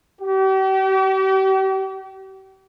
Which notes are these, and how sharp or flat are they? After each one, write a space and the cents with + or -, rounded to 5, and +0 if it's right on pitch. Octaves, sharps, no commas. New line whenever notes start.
G4 -40